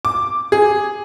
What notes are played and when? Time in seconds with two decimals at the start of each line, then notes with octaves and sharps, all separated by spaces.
0.05 D6
0.52 G#4